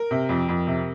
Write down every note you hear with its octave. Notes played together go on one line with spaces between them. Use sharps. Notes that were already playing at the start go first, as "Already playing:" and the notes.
Already playing: A#4
C3
F2
F2
C3